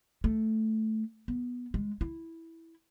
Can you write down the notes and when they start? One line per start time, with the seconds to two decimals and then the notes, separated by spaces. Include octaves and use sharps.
0.24 A3
1.28 B3
1.74 G#3
2.01 E4